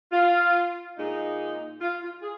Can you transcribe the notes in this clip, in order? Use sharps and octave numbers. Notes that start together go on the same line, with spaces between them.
F4
A#2 G#3 D#4
F4
F4
G#4